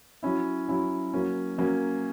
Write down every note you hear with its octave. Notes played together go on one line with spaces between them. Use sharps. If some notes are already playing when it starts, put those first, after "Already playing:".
F#3 C#4 E4
F#3 C#4 E4
F#3 A#3 C#4
F#3 A#3 C#4